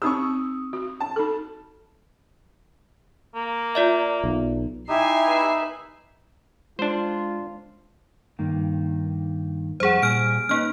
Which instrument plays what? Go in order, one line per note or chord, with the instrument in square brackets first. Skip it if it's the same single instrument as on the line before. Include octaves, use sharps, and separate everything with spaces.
[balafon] C4 D#4 G4 [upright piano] C#6 D#6 E6
[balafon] F#4
[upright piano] A5
[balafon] D#4 A4
[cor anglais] A#3
[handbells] F4 D5 E5
[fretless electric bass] B1
[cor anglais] D#4 [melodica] E4 G4 [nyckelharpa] E5 [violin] G#5 C7
[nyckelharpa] B4 E5
[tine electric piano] G#3 [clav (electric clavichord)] D4 C5 [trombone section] F4
[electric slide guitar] G2 D#3 A#3
[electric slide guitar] F2 G3 F#5 [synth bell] G#4 C5
[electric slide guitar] A#2 G3 G#4 [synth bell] F6 D7
[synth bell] A#3 F6 [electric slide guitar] C#4 D#4 B4